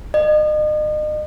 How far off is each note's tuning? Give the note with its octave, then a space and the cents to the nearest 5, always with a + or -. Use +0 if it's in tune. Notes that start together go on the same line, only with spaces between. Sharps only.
D#5 -40